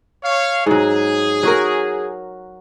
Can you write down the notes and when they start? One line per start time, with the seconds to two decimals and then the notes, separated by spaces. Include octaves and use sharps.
0.23 C#5 F5
0.66 G#2 F#3 G#4
1.43 F#3 F#4 A#4